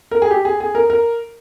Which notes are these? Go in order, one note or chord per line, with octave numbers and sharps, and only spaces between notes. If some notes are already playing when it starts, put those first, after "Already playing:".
A#4
G#4
G4
G#4
G#4
A#4
A#4